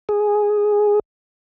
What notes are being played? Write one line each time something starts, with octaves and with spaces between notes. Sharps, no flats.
G#4